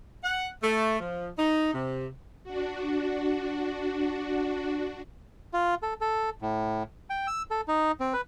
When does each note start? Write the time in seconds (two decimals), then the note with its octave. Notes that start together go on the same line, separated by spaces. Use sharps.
0.23 F#5
0.63 A3
1.00 F3
1.38 D#4
1.74 C3
2.44 D4 F#4
5.53 F4
5.83 A4
6.01 A4
6.42 A2
7.10 G5
7.27 E6
7.51 A4
7.68 D#4
8.00 C4
8.14 B4